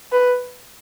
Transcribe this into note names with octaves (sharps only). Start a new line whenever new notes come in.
B4